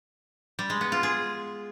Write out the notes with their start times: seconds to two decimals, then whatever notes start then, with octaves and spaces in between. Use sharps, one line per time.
0.59 G3
0.70 G#3
0.81 B3
0.92 F4
1.03 G#4